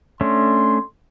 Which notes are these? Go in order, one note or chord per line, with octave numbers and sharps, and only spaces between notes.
A3 C#4 D4 C6